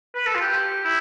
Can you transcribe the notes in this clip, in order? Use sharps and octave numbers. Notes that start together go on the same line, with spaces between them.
B4
A4
F4
G4
E4